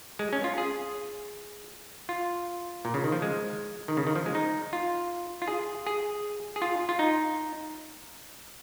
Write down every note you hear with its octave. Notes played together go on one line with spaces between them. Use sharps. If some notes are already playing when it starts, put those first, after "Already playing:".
G#3
C#4
F4
G#4
F4
A#2
C#3
D#3
F3
G#3
D#3
C#3
D#3
F3
G#3
D#4
F4
F4
G#4
G#4
G#4
F4
F4
D#4